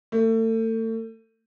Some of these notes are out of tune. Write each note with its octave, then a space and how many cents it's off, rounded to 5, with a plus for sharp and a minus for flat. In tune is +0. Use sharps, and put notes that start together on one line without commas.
A3 +35